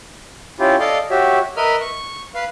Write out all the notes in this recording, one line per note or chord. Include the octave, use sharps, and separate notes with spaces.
C#4 E4 F4 G4
A4 D5 D#5 F5
F#4 G4 C#5 E5
A#4 B4 D#5 E5 D#6 F6
C#6
B4 F5